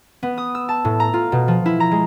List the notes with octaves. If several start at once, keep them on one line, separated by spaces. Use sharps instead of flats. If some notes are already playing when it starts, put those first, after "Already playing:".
B3
D#6
E6
A5
A2
A#5
F4
B2
F3
E4
A#5
G#3